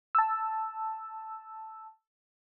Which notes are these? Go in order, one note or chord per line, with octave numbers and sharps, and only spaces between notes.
A5 E6